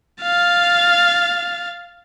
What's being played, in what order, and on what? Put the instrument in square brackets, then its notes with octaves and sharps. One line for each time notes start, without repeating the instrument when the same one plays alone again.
[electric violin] F5 A6